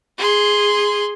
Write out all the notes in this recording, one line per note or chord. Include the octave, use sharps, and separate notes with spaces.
G#4 C6